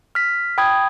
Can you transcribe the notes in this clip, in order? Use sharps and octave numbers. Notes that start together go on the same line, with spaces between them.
F6 B6
G5 B5 D#6 G#6